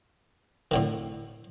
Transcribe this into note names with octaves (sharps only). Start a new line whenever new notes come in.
A2 D3 D#3